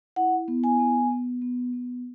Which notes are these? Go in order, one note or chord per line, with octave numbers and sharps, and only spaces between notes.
E4 F#5
B3
G#5
B3
B3
B3
B3